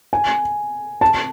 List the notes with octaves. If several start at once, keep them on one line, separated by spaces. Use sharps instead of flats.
G#5
A5